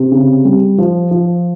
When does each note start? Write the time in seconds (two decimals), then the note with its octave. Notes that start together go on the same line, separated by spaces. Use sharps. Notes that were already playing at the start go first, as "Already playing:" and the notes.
Already playing: C3
0.11 C#3
0.45 G3
0.78 F3
1.11 F3